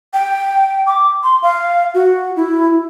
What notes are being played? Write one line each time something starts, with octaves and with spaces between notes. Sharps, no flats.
G5
D6
C6
F5
F#4
E4